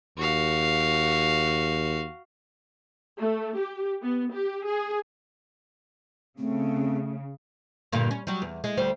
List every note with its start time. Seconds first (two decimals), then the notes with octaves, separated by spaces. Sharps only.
0.18 D#2 F#4 F5
3.19 A3
3.56 G4
4.03 B3
4.33 G4
4.66 G#4
6.39 C#3 A3 C4
7.92 G2 A#2 D3
8.11 C#4
8.27 F#3 G3
8.42 E2
8.64 G#3
8.77 D2 G3 C5